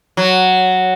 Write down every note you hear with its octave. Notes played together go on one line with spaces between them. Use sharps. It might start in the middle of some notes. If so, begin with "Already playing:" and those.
F#3